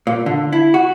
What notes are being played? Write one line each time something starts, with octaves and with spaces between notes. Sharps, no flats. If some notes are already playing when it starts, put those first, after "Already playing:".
A#2
D3
E4
F#4